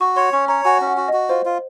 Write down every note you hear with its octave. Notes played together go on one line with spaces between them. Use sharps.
F#4 C#6
C#5 C6
C#4 C#6
C#5 A#5
F#4 G#5
C#4
F#5
F#4
F#4 D#5
F4 C5
F4